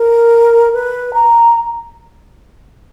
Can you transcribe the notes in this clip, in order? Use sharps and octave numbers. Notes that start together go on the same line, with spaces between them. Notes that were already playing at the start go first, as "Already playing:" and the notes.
Already playing: A#4
B4
A#5